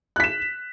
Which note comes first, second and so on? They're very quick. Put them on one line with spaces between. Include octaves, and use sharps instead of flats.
F#6 B6 E7